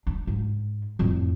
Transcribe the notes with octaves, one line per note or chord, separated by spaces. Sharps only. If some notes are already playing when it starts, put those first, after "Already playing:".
D4
G#2
F2 A2